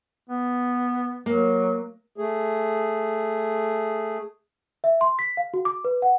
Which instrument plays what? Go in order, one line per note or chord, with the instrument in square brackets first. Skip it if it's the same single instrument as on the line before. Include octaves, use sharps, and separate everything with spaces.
[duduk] B3
[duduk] F#3 [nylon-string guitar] A#3
[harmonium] A3 G#4
[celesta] E5
C6
B6
F5
F#4
D6
B4
F#5